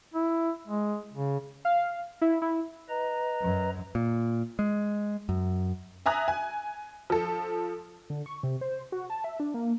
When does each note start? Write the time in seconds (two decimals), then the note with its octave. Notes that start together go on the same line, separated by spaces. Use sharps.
0.14 E4
0.67 G#3
1.13 C#3
1.65 F5
2.21 E4
2.42 E4
2.89 B4 D#5 A#5
3.41 F#2
3.95 A#2
4.59 G#3
5.29 F#2
6.06 E5 G#5 A#5 D#6 F#6
6.28 G#5
7.10 F3 A4
8.10 D3
8.26 C#6
8.43 C3
8.61 C5
8.92 F#4
9.10 A5
9.24 E5
9.40 D4
9.54 A#3